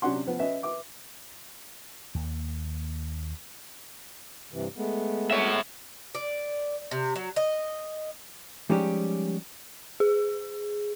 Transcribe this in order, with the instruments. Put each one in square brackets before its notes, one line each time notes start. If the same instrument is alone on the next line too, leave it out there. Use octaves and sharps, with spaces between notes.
[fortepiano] C3 F#3 C#4 D4 F#5 C6
F3 B3
C#4 B4 D#5 E5
B4 E5 D6
[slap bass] D#2 A#3
[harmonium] G2 C3 E3
G#3 A3 B3
[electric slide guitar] C#5 E5
[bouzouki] D5
C3
F#3
D#5
[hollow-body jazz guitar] F3 G3 G#3 C#4 D#4 G4
[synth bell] G#4